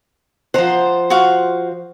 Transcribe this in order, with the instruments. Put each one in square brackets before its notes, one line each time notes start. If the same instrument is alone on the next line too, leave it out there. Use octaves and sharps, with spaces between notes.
[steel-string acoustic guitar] F3 C5 [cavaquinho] F#5 A#5
[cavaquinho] F#4 F5